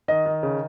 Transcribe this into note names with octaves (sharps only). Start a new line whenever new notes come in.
D#3 D#5
D#3
C#3